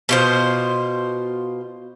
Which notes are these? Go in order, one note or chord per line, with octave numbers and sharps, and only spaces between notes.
B2 F4 C5